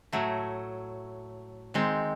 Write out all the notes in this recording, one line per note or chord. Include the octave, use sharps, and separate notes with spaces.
A2 F#3 A3
D#3 G#3 C4